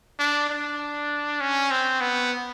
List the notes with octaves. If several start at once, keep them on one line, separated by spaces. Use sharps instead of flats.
D4
D4
C#4
C4
B3